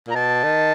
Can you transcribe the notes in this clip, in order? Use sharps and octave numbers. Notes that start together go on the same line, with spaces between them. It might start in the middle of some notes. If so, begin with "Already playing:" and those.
A#2
A#5
B2 A5
D#3